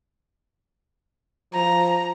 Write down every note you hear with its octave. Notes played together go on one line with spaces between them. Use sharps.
F3 A#5